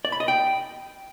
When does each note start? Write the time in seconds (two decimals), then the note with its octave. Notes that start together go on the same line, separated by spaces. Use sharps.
0.05 D5
0.12 B5
0.20 D#5
0.28 G5